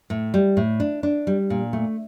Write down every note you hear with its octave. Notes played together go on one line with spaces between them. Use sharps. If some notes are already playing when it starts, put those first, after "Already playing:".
A2
G3
A2
D4
D4
G3
A#2
A3